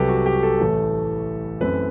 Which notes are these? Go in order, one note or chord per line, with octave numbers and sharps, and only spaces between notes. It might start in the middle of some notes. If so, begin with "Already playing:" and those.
Already playing: C2 C3 F#3 G4 A4 B4
F#4
G4
A4
A1 A2 E3 A3
F#2 E3 A3 C4 B4